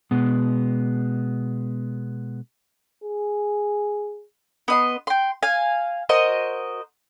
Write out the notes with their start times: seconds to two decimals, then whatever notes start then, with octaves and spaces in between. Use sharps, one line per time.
0.11 B2 G#3 B3
3.04 G#4
4.68 B3 D#5 C6
5.07 G5 C6
5.43 F5 G#5
6.09 F#4 A#4 C5 D#5